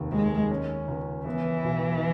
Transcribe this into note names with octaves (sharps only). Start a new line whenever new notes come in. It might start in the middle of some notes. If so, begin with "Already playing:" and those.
Already playing: F1 D#2
D#2 G#3
C#4
C#2
E3 B3
B1